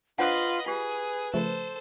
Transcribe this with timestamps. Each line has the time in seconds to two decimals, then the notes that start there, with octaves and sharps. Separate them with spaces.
0.18 D4 F4 B4 C5 D#5 F5 F#5 F#6
0.66 F4 G4 G#4 B4
1.34 C#3 F3 A3 A4 C5